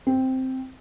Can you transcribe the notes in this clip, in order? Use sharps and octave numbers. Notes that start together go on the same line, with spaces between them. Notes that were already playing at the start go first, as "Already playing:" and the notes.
C4